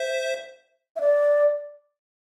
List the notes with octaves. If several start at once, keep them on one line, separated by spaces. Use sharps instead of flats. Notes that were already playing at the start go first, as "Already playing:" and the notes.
Already playing: C5 E5
E5
D5